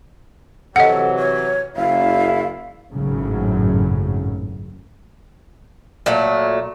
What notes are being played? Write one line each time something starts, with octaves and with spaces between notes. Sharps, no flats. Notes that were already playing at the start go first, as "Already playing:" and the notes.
C3 E3 F#3 A4 D#5 F#5
C#5
F#1 E4 F5
G#1 F#2 A2 C#3 F#3
A#2 F#3 A3